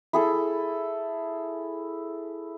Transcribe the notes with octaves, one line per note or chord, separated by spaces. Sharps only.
E4 G#4 A4